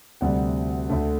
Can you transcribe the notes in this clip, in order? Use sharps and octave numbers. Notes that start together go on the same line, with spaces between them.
D2 C3 G3 D5 F#5
D2 D3 A3 D4